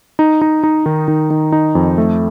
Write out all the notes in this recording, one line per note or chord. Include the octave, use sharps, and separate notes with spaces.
D#4
D#4
D#4
D#3
D#3
D#3
D#4
F2
A3